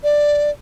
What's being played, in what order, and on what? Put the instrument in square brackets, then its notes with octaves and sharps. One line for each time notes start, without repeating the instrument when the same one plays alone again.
[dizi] D5